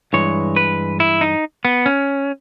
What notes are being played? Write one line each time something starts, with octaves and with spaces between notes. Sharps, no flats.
G2 E3 G#3 C#5
B4
E4
D#4
B3
C#4